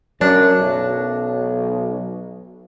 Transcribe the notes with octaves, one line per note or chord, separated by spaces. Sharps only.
F#2 F#3 D4
B1